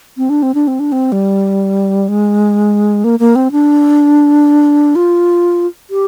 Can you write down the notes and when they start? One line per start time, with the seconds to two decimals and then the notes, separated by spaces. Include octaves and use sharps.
0.18 C4
0.30 D4
0.43 C4
0.54 D4
0.68 C4
0.80 D4
0.92 C4
1.12 G3
2.08 G#3
3.04 A#3
3.19 A#3
3.36 C4
3.52 D4
4.95 F4
5.90 G4